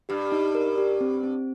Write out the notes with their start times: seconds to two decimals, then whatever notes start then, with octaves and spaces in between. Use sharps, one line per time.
0.09 G2 G4
0.32 D#4
0.55 A#4
0.78 G4
1.01 C4
1.23 C4